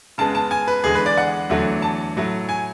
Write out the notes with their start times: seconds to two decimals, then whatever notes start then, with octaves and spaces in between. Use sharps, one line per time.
0.18 C#3 G#3 B3 A5
0.35 A5
0.51 G#5
0.67 B4
0.84 E2 D3 G#3 G#4
0.95 B4
1.06 D5
1.17 F#5
1.49 E2 D3 F#3 A3
1.82 A5
2.16 A2 F#3 A3
2.49 G#5